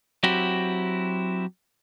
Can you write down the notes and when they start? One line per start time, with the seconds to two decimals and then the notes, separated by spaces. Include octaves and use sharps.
0.23 F#3 C4 E4 F#4 G4